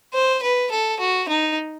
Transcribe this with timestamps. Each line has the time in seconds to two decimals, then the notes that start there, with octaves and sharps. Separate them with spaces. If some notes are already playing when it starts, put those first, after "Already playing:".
0.14 C5
0.42 B4
0.71 A4
1.00 F#4
1.29 D#4